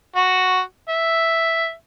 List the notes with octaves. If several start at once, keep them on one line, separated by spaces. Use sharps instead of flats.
F#4
E5